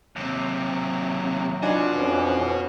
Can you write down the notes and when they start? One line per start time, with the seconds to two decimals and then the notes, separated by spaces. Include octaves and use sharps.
0.16 D#2 C3 F#3
1.63 D4 F4 F#4 B4 D#5 G#5
1.94 F2 E3 F3 C#4